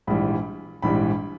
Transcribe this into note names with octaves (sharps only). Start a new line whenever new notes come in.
A#1 G#2 E3 G3 B5
A#1 G#2 E3 G3 B5